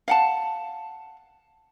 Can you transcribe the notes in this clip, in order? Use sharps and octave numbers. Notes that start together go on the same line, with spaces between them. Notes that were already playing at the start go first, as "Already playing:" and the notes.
F5 F#5 A5